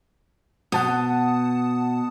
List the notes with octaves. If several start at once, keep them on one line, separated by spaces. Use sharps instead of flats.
B2 F#5 A5 D#6